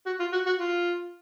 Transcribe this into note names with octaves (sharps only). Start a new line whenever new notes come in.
F#4
F4
F#4
F#4
F4